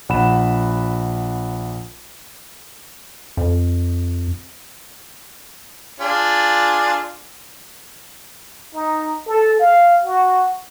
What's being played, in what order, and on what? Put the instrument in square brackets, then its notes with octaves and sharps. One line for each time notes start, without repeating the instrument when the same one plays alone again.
[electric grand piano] A#1 F#5 B5 E7
[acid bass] F2
[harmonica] D4 F4 G#4
[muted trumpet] D#4
A4
F5
F#4